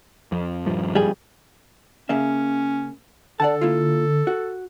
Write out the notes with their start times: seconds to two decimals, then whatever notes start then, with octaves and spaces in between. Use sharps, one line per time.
0.32 F2
0.65 D#1 G2 F3
0.95 G3 G#4
2.09 C#3 A#3 C#4 E5
3.40 D3 A4 D5 F#5 A5
3.61 A#3 E4 F4
4.27 F#4